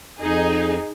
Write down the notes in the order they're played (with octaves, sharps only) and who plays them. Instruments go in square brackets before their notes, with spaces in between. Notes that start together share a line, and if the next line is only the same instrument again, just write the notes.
[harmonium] F2 [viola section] D#4 G#4